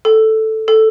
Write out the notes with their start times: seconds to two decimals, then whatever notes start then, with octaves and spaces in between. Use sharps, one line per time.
0.05 A4
0.68 A4